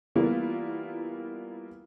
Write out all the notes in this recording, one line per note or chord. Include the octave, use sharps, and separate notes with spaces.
E3 G3 A#3 B3 E4 F4